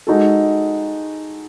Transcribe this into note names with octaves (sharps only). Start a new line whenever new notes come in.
G#3 D#4 F#4 A4